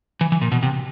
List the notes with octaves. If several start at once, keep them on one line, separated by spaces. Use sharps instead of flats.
E3
E3
A#2
B2
C3